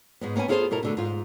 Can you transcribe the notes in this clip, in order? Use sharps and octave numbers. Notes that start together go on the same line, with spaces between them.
G#2 G#3 B3
A#3 B3 C#4 E5 G#5
B3 E4 F4 G#4 A4 C5
B2 E4 A4 A#4
B2 D3 A3
G#2 F4